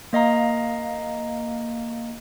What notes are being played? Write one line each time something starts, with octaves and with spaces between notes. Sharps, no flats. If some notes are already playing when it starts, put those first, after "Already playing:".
A#3 D#5 F5 A#5